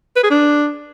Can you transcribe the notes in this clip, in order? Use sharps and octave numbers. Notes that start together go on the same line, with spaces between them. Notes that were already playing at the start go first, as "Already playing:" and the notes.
B4
G#4
D4